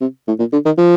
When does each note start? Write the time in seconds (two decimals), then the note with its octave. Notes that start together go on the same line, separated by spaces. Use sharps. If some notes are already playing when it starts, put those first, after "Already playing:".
0.01 C3
0.28 A2
0.39 A#2
0.53 D3
0.66 D#3
0.78 F3